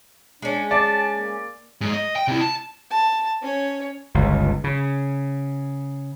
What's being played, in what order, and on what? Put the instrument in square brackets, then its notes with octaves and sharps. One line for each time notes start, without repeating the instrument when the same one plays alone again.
[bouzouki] G#3 C#4 [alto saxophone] D4
[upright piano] D5 [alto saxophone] A5
[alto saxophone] A#3
[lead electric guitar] G#2 G#3
D#5
G5
C3 E4
A5
[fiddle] A5
C#4 C#5
[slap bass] G1 C#2
C#3